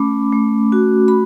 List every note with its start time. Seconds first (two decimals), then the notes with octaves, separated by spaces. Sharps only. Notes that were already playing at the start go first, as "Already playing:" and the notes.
Already playing: A3 C#4 B5 D6
0.32 A3
0.72 F#4
1.08 B5